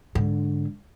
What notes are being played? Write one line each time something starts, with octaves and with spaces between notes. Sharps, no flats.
G#2 D3